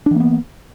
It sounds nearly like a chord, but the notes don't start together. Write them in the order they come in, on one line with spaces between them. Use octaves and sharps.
D4 E3 A#3 B3